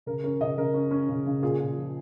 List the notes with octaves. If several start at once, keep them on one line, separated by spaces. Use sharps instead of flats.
C#3 A#4
C#4 A#4
C#3 D#5
C#3 A#4
C#4
C#4
C#3
C#3
A#2 G#4
A#2
F3